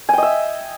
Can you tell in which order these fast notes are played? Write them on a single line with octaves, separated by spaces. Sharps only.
G#5 G5 D#5 E5